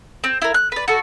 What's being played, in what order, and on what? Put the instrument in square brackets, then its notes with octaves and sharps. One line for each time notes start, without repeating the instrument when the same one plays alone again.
[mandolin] C4
E4 A#4
F#6
B4 D5
F#4 A4